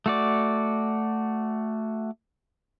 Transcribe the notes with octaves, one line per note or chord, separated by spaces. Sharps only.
A3 F#4 D5